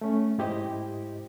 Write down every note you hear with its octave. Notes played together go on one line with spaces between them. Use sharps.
A3 C#4
G#2 E4 G4 C5 D#5